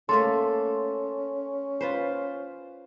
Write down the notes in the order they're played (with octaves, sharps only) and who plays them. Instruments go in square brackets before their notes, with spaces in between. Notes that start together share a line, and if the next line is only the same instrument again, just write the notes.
[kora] A3 A#3 A4 [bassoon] C#4 [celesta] C6
[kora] F4 B4 C5